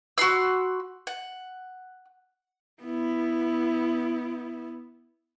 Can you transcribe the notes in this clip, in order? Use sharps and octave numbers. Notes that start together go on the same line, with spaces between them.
F#4 B5 C6 E6
F#5
B3 E4